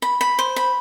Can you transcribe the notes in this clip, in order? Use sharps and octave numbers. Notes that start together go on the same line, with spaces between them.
B5
B5
C5
B5